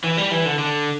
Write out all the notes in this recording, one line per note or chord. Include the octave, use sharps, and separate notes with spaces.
E3
G3
E3
D3
D3